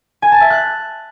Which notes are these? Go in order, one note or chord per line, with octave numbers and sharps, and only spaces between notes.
G#5
A5
E5
F#6